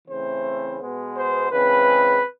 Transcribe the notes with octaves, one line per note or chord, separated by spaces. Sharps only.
C#3 E3 A3 C4 C5
B2 G#3 B3
C5
C#3 E3 G#3 C4 B4